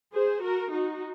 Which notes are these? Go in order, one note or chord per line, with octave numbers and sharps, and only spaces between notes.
G#4 C5
F#4 A#4
D#4 F#4